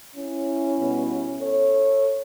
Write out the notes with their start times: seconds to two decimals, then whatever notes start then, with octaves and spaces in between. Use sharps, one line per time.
0.16 C#4 E4
0.79 B2 G3 B3
1.42 A4 C#5